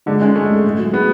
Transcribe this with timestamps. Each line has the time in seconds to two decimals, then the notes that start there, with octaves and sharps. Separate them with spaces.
0.06 D3 G#3
0.21 G#3 C#4
0.35 G#3 A3
0.50 G#3
0.64 A2
0.78 F#3
0.93 B3 G#4